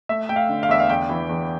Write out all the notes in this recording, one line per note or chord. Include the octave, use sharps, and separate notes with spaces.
A3 E5
A3 G5
F5
D3
F5
E2 E5
F5
E2 G5
E3
E2